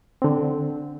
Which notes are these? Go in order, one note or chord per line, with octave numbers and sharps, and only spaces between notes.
D3 C4